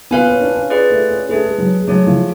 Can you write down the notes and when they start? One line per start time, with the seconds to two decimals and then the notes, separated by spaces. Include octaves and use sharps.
0.11 B3 F4 B4 F5 G#5
0.27 C#4
0.40 D4
0.55 C#4
0.70 F4 G#4 B4 D5
0.90 A3
1.09 C#4
1.29 A3 D4 G#4 B4
1.44 G#3
1.58 F#3
1.78 G#3
1.88 F#3 A3 D4 G#4 C#5
2.07 F3